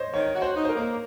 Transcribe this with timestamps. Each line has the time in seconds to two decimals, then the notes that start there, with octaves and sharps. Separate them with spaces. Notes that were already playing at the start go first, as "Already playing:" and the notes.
Already playing: C5 C#5 D#5
0.14 D#3 C#5
0.34 F#4
0.42 C5
0.55 D#4
0.65 C5
0.69 A#4
0.76 A#3